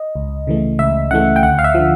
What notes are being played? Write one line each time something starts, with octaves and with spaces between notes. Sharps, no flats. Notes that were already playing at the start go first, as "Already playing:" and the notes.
Already playing: D#5
C#2
C#3 E3 A3
C#2 E5
C#3 E3 A3 F#5
G5
D2 F#5
F5
E5
D3 F3